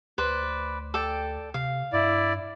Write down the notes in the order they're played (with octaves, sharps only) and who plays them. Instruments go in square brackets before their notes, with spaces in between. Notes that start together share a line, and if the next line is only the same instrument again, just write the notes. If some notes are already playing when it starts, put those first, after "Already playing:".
[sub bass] D2 [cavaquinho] B4 C5 D5
[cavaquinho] A4 D5 G5
[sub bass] C3 [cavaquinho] F5
[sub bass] G2 [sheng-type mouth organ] E4 D5